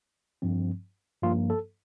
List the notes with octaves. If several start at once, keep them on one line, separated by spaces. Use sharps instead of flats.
G2 F3 C4
G2 F3 A#3 F4
A4